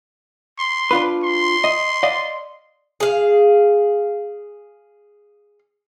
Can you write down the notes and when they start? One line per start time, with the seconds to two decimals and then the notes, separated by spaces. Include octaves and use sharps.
0.59 C6
0.91 D4 F4 B4
1.23 C6
1.64 D#5
2.03 D5 D#5 F5
3.00 G#4 F5